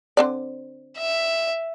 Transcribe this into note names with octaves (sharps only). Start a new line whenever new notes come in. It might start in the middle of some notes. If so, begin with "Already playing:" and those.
D3 C4 D5
E5